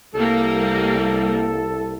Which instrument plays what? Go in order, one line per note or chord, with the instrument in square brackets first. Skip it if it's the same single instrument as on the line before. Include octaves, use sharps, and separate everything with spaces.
[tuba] C2 [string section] G3 A#3 [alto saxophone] A4